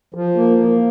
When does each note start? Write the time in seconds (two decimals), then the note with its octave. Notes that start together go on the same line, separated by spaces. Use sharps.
0.14 F3
0.35 A#3
0.57 A#3